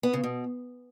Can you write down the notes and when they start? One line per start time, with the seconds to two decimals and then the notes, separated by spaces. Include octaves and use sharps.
0.03 B3
0.13 C#3
0.24 B2